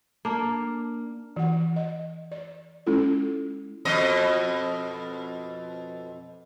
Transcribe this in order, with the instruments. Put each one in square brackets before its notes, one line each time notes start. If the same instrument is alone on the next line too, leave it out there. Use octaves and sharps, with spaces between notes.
[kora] A#3 D4
[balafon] E3 F#5
D#5
D5
G#3 C#4 E4 F4 A4
[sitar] F2 B2 D#5